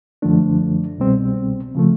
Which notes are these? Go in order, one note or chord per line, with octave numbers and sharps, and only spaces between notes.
F#2 D3 F3 A3 D4
C2 B2 G3 C4
C#3 F3 A3